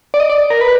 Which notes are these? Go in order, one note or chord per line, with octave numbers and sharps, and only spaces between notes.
D5
D#5
D5
A#4
B4